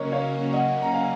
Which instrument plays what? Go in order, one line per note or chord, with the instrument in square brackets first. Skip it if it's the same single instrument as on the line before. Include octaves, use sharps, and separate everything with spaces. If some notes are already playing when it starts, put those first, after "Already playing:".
Already playing: [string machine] C#3 F#3 A#3 C#4 F#4 [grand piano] A#4 C#5 D#5
[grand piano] C#5 F5
D#5 F#5
A#5
F5 G#5